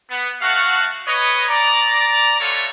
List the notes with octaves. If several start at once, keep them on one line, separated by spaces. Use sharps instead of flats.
B3
A3 F#4 F5
B4 C#5 D#5
D5 A#5
G3 A3 B3 F4 A4 C#5